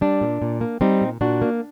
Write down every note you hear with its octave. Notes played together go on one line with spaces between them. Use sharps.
G3 D4
A#2
A#2
A#3
G3 C4 D#4
A#2
A#2 D4 F#4
A#3